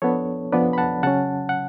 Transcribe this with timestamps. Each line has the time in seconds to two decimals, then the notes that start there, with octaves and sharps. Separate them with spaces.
0.02 F3 B3 D4 A4 C#5
0.52 F3 B3 D4 B4 D5
0.73 B5
0.78 F#5 A5
1.03 C#3 F#3 C#4 F#5 A5
1.49 F#5